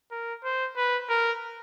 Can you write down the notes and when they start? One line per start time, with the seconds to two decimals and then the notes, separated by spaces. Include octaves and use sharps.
0.11 A#4
0.44 C5
0.77 B4
1.09 A#4